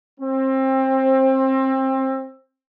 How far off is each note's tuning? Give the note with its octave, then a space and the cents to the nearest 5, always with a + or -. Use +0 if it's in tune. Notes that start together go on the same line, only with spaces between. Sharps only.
C4 +25